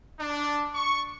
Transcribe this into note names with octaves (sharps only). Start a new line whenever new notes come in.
D4
C#6